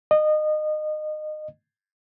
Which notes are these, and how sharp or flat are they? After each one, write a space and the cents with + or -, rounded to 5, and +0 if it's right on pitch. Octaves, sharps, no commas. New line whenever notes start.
D#5 -25